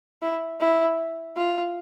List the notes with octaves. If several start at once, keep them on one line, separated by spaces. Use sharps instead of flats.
E4
E4
F4